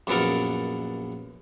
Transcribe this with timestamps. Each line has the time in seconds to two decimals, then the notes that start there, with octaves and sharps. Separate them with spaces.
0.07 A#1 F#2 B3 A4 A#4